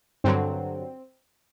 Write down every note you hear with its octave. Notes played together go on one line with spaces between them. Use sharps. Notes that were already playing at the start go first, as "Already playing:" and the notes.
G2 D3 F#3 C4